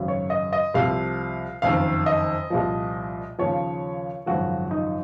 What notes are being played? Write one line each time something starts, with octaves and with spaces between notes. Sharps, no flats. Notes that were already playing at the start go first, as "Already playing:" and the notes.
Already playing: G#1 F#2 C#3
C#5
D#5
D#5
C2 C3 F3 F5
F#1 F2 D#3 F5
D#5
C2 A#2 F3
D#2 C#3 F3 C#5
G#1 F#2 C#3 F3 F#4
D#4